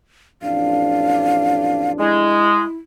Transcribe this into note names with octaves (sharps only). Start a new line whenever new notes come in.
A1 F2 D4 F5
G#3 E4